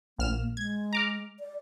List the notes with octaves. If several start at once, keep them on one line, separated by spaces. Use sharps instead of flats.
A#1 A#3 F6 E7
G#3 G#6
A#5 D6 F6
D5